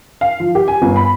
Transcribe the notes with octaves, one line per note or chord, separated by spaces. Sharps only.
F5
F3
G4
G#5
G1
B5